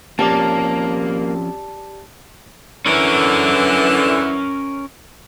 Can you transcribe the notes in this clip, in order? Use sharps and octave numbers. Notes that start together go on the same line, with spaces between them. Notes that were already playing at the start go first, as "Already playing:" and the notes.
F3 A#3 C4 C#4 G4 D5 A5 D6
D3 E3 C#4 A#4